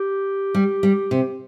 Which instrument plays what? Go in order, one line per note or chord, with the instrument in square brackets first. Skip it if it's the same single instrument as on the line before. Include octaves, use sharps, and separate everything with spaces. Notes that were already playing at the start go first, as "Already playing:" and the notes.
Already playing: [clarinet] G4
[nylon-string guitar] G3
G3
C3